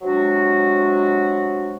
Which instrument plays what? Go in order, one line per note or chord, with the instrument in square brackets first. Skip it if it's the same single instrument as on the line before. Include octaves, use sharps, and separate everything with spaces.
[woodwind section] C3 F#3 G#3 D4 F#4